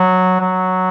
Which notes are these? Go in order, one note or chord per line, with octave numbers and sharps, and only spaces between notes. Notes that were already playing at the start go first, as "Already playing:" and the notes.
Already playing: F#3
F#3